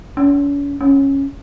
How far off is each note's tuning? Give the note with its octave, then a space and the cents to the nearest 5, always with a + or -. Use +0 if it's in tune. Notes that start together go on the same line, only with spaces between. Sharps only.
C#4 +40
C#4 -10